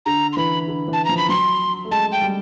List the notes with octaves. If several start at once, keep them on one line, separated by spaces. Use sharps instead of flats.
D3 A#5
C6
E3 B5
D3
E3 A5
F3 A#5
B5
F#3 C6
A3
G#3 A5
G5
G3